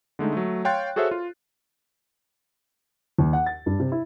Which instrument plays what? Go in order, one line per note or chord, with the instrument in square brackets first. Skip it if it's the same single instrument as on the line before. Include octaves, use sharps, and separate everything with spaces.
[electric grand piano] D3 G#3 A3 D#4
F#3 A3
C#5 F5 G5 C6 F#6 A6
F#4 G#4 A4 C5 C#5 E5
F4
[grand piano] D#2
F#5
A6
G2
C3
E4